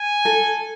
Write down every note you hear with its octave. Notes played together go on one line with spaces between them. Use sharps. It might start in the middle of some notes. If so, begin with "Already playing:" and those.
Already playing: G#5
A4